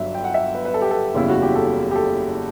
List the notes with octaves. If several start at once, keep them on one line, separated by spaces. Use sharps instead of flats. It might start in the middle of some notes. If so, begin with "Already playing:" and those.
Already playing: G1 G2 F#3 E5
G5
F#5
E5
B4
B4
A4
G4
A4
F#1 E2 C#3 G3 E4
F#4
G4
A4
G4
A4